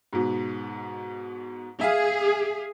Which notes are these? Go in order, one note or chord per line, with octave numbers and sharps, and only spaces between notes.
G#2 B2
G#4 E5 F5